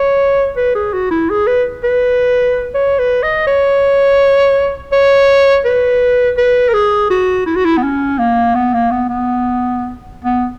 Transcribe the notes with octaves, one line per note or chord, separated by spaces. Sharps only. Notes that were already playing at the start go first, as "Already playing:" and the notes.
Already playing: C#5
B4
G#4
F#4
E4
G#4
B4
B4
C#5
B4
D#5
C#5
C#5
B4
B4
A#4
G#4
F#4
E4
F#4
E4
B3
C#4
A#3
B3
A#3
B3
B3
B3